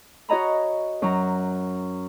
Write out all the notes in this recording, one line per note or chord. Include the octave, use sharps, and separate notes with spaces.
F#4 C#5 D#5 A#5 B5
F#2 F#3 A#5